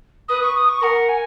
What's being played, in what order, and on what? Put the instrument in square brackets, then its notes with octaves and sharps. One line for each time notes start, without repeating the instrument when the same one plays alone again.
[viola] B4 [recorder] D#6
[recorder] C#6
D#6
C#6
[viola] A#4 [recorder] F#5
[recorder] G#5